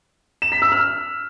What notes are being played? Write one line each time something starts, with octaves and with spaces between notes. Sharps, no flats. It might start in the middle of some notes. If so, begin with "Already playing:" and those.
E7
B6
E6
F6